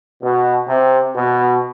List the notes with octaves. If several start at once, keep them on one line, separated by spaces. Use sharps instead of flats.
B2
C3
B2